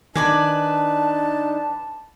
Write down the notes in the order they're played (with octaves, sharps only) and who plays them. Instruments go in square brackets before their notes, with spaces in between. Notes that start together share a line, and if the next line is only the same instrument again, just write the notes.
[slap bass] D#3 [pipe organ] D4 D#4 [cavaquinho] B4 D5 G#5 [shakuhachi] A5